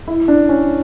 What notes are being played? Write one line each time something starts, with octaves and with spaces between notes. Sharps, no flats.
E4
D4
C#4